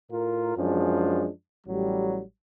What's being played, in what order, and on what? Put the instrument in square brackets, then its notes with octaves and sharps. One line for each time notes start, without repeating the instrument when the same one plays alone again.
[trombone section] A2 F4 A#4
F#2 F3 G#3 D4
A1 F#3 G3